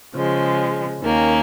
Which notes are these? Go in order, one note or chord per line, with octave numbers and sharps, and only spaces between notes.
C#3 F3 G#3
D#2 D#3 A#3 C#4